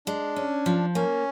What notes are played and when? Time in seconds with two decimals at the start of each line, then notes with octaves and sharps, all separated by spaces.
0.07 G#3 D4
0.36 C#4
0.66 F3
0.95 A#3 C#4